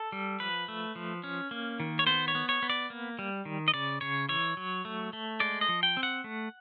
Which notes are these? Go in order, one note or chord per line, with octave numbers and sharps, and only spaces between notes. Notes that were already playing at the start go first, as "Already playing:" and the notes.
Already playing: A4
G3
F3 B4
A3
F3
C#4
A#3
D#3
C#5
B3 C5
C#5
B3
C#5
B3
D5
A#3
G3
D#3
D#5
C#3 D5
C#3 C#5
E3 C#5
F#3
A3
A3
G#3 D5
D#5
F3
G5
C4
F#5
A3